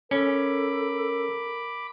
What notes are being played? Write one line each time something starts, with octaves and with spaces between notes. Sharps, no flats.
C#4 A4 A#4 B5 D6